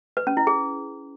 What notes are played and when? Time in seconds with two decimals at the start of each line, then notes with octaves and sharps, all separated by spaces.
0.17 B4
0.27 C#4
0.37 E4
0.47 G#4